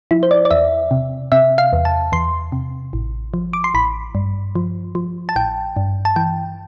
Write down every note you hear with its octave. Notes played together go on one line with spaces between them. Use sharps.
F3 E4
C5
D5
D5
E2 E5
C3
C3 E5
F5
E2
A5
E2 C6
C3
A1
F3
D6
C6
A1 B5
G2
F3
F3
A5
A1 G5
G2
A5
E3 G5